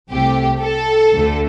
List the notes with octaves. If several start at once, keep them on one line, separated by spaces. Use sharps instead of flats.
C2 C3 A3 G4
A4
D2 D3 A3